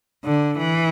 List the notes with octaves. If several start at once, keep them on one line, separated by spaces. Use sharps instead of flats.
D3
E3